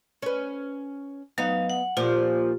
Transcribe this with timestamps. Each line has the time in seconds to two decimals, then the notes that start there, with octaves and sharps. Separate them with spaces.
0.22 C#4 B4
1.38 F#3 B3 D#4 F5
1.70 F#5
1.97 A#2 F3 F4 G4